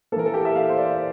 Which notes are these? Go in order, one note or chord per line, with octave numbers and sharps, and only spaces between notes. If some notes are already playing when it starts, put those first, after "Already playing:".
E3 A#3 A4 A#4
A4
G4
E5
F5
C5
D5